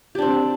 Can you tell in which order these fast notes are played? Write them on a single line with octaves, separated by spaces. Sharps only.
G4 D4 C4